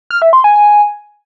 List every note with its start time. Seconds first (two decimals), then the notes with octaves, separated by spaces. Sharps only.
0.10 F6
0.22 E5
0.33 C6
0.44 G#5
0.55 G#5